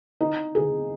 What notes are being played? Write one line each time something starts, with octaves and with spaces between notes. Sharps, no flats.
D#4
G#4